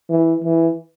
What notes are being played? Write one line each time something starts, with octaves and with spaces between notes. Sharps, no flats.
E3
E3